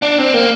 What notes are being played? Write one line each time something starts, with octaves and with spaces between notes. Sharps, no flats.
D4
C4
A#3